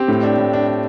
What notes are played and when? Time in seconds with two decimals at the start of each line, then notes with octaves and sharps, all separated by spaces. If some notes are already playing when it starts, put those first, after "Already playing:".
Already playing: C4 G4
0.08 A2
0.23 D4
0.38 A2
0.53 D4
0.67 D4